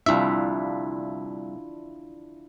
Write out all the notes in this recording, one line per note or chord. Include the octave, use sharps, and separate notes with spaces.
C2 D4 E4 F4 E5